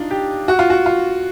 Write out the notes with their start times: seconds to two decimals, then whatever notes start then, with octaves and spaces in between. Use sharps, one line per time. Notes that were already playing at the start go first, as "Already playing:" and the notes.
Already playing: D4 D#4 F4
0.11 G4
0.48 F#4
0.59 F4
0.70 F#4
0.86 F4